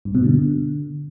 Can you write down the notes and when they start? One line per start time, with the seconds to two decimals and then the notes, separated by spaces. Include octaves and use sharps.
0.05 G2
0.15 B2
0.24 D3